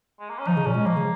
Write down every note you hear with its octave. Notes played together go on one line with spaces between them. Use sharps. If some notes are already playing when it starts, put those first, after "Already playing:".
G#3
A#3
C#4
F3 D#4
C#3
A#2 C#4
G#3
F3 A#3
C#3